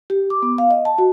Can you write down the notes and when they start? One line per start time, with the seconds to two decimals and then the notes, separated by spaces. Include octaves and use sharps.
0.10 G4
0.30 D6
0.43 B3
0.58 F5
0.71 D#5
0.85 A5
0.98 F#4